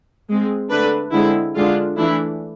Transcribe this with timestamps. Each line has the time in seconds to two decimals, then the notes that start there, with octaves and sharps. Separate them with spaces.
0.29 G#3 C4
0.71 D3 A3 D4 B4
1.13 D3 G#3 C4 E4
1.55 D3 G#3 D4 F4
1.97 E3 A3 D4 E4